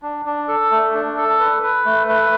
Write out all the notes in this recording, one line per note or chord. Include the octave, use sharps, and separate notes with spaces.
D4
D4
A4
A3
D4
A4
B4
B4
A3
B4